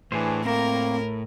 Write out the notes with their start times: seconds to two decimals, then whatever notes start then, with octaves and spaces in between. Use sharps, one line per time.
0.12 A2 E3 D4 G#4 C5
0.45 A#3 C4 A#4 A#5